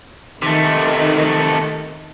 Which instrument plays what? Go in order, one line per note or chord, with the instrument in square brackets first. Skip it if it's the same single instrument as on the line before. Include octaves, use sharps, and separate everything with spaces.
[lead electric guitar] C3 A3 [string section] D#3